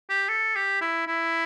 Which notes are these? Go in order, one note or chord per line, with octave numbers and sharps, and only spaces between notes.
G4
A4
G4
E4
E4